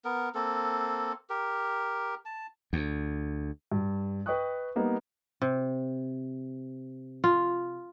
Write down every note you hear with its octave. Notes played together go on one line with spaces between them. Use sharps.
B3 A#4
A#3 C4 A4
G4 A#4
A5
D2
G2
B4 D#5 G5 C#6 D#6 F#6
G3 A#3 B3 D#4
C3
F4